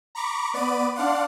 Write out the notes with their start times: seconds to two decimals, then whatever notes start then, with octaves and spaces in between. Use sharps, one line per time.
0.15 A#5 B5 C#6 D6
0.54 B3 D5 B5 D7 D#7
0.95 D4 D5 F5 F#5 C6